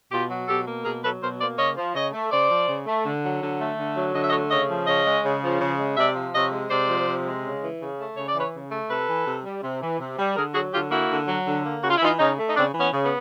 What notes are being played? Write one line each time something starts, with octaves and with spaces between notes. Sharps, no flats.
B2 F4 G4
F#3
B2 G4 A4
A#3
B2 G#4 A#4
F#3 A4 B4
B2 A#4 C5
A#3 C5 D5
C#3 C#5 D#5
F3
C#3 C#5 D#5
A3
C#3 C5 D5
F3
C#3
A3
D3
F#3
D3
A3
D3
F#3
D3 D#5
E5
C#5 D#5
A3
C#3 C#5 D#5
F3
C#3 C#5 D#5
G#3
C#3
F3
C#3
G#3
C3 D5 E5
F3
C3 C#5 D#5
G#3
C3 C5 D5
F3
C3
G#3
C#3
E3
C#3
A3
C#3 C#5
D5
E3 B4 C#5
C#3
A3
C3 A4 B4
E3
C3
G3
C3
E3
C3
G3
D3 G#4 A#4
F#3 F#4 G#4
D3 F4 G4
A#3 E4 F#4
D3
F#3
D3
A#3
C#3 F#4
F4
E4
E3 D#4 F4
C#3 C#4 D#4
A3
D#4
C#3 C4 D4
E3
B3 C#4
C#3
B3